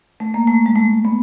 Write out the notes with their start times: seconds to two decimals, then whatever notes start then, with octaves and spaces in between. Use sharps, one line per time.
0.20 A3
0.34 A#3
0.48 A3
0.66 G#3
0.76 A3
1.05 B3